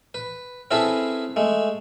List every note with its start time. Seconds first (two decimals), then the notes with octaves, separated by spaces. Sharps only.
0.14 B4
0.71 C4 C#4 E4 G#4 A4 B4
1.36 G#3 A3